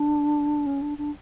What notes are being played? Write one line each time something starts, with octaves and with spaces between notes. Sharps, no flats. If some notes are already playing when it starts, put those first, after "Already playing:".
Already playing: D4
C#4
D4
D4